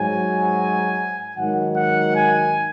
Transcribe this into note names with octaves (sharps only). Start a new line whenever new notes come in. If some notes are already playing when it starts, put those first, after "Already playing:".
Already playing: G#2 F#3 G#5
G#2 D#3 F#3 F#5
F#5
G#5